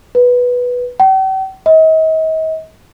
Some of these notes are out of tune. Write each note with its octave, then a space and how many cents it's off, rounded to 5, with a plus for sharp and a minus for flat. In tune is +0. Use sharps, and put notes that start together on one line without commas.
B4 -5
G5 -45
D#5 +40